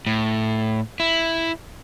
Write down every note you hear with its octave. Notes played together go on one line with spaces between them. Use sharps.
A2
E4